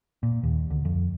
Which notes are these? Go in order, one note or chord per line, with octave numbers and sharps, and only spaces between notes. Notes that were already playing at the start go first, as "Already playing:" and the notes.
A#2
D#2
D2
F2